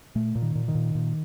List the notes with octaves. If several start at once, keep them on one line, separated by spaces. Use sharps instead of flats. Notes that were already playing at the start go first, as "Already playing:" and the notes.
A#2 A3
A#2
D#3
A#2
D#3
A#2
A#2